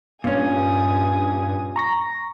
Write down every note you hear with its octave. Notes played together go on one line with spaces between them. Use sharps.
G2 A#2 C#4 G#5 D#6
A#5 C#6 A#6